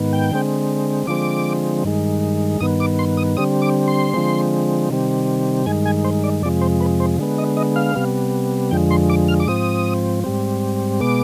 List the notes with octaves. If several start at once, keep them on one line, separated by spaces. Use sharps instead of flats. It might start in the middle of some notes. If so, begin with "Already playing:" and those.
Already playing: G#2 D#3 B3
G5
D3 G#3 C4
D3 F3 G#3 C4 D6
G2 D#3 G#3
G2 D#3 B3 D#6
D6
C6
D#6
D3 G3 C4 D#6
D6
C6
D3 F3 G#3 C4
C3 D#3 G3 C4
G2 D#3 G#3 G#5
G#5
C5
D5
F2 C3 F3 G#3 D5
C5
B4
C5
D3 G#3 B3
D#5
D#5
F5
C3 G3 B3
F2 D3 F3 G#3 G5
C6
D6
F6
D6
G#2 F3 C4 D#6
G#2 G3 C4
B2 G#3 B3 D6